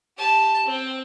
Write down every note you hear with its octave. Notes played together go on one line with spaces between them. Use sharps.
G4 A5
C4